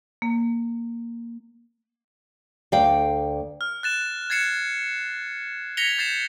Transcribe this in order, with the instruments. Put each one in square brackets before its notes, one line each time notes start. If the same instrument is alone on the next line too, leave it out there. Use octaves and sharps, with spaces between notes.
[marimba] A#3
[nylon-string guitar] D2 D5 F5 G5
[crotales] F6
F#6 A6 E7
G#6 A6 C7 C#7 E7
G#6 A#6 B6 C#7 F7 G7
G6 A6 C7 E7